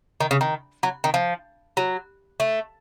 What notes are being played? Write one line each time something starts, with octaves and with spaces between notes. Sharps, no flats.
D#3
C#3
D#3
F#3
D#3
F3
F#3
A3